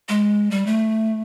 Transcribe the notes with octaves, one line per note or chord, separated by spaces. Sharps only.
G#3
G3
A3